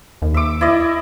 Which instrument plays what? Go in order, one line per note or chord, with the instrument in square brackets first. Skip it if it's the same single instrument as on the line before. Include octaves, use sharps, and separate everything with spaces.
[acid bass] D#2
[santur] E5 D6
E4 D5 D#5